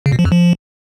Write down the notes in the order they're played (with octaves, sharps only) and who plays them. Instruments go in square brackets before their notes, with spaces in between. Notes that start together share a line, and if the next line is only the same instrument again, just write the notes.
[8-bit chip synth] C#3
B2
F3
F2
F3